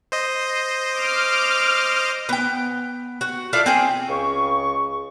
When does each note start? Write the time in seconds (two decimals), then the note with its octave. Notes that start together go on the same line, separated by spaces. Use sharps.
0.12 C5 D#5
0.97 D6 F6
2.29 B3 G5
3.21 F#4
3.53 E4 F4 A4 D5
3.66 C4 G#4 G5
4.09 C#2 C#3 C#6